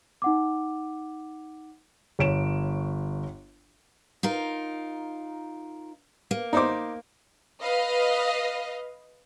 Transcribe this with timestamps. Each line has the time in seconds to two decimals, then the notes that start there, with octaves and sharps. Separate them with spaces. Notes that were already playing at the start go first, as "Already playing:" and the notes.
0.22 D#4 F#5 D6
2.19 G1 C#5 D7 E7
4.23 D#4 F4 A#4
6.31 A#3
6.53 D#4 C5 D6
7.62 B4 D#5 F5